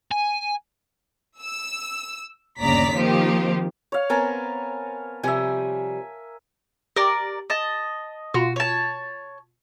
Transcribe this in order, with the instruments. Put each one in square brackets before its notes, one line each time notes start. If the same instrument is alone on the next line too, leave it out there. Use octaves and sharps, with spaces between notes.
[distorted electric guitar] G#5
[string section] E6
G1 D#2 C#3 D5 A#5 B6
D#3 F3 A#3 C4 G4
[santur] C#5 F5
[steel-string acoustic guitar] B3 C4 [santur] A#4 G#5 A5
[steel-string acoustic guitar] C3 F3 G3 [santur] E5 G#5
[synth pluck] G4 [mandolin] A#4 D5
[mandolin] D#5 A5
[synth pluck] B2 F4 [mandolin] F#4
[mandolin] C#5 A5